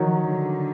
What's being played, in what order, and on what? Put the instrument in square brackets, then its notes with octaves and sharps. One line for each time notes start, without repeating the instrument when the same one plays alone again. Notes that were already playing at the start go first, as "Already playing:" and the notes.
Already playing: [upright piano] D#3 F#3 [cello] F3
[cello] D3